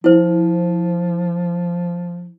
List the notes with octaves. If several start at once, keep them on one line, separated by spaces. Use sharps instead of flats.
F3 E4 C5